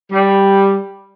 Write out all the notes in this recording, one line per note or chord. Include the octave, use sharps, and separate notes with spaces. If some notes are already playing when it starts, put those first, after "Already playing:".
G3